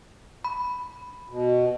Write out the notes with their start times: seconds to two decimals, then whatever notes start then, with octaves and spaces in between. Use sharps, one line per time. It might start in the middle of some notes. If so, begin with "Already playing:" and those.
0.44 B5
1.30 B2